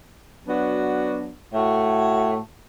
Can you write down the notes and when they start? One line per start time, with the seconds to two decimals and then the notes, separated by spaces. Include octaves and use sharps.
0.45 F#3 B3 D4 F#4
1.52 A2 A3 F#4